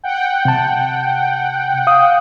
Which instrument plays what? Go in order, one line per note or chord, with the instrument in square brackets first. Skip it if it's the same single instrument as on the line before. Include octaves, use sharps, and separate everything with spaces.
[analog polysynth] F#5 G5
[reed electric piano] C3 A5
F5 D#6